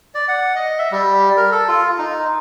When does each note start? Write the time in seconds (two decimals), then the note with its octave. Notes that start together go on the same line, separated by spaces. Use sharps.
0.15 D5
0.28 F#5
0.56 D#5
0.78 E5
0.91 G3
1.37 A#4
1.52 A4
1.68 F4
1.99 D#4